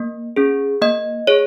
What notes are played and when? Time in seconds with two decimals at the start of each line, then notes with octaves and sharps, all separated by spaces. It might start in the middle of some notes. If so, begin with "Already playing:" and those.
Already playing: A#3
0.36 C#4 G#4
0.81 A#3 D#5
1.27 G#4 C#5